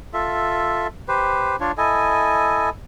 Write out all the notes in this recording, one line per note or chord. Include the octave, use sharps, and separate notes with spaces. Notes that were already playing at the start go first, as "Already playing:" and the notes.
F4 A4 E5
G4 B4 C5
D4 F4 C#5
E4 A4 D#5 G#5